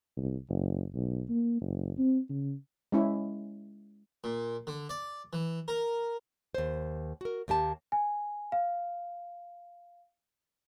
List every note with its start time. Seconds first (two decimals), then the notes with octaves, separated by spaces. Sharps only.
0.17 C2
0.49 F#1
0.95 B1
1.29 A#3
1.62 F#1
1.98 C4
2.29 C#3
2.92 G#3 C#4 E4
4.24 A#2
4.67 D3
4.89 D5
5.33 E3
5.68 A#4
6.55 D#2 C5
7.21 F#4 A#4
7.48 D#2 A#3 G4 A5
7.92 G#5
8.52 F5